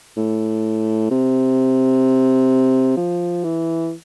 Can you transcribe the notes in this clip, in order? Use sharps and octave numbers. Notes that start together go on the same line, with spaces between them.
A2
C3
F3
E3